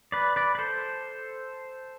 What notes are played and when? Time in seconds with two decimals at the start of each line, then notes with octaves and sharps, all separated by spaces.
0.12 B4 D5
0.36 B4 D5
0.55 B4
0.59 A4 C5